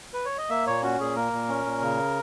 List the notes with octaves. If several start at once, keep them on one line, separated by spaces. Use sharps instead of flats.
B4
C#5
D#5
A#3 E5
A#2 C#5
C#4 F#4
A#2 G#4
A#3 A#4
A#2
C#4
A#2
C#3